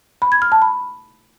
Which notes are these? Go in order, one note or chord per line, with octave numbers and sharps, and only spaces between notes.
B5
G#6
F6
A5
B5